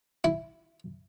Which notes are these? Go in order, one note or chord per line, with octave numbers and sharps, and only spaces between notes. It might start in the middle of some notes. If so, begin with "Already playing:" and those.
E4